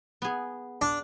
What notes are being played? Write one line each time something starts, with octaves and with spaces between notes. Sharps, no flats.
B3 G#4
D4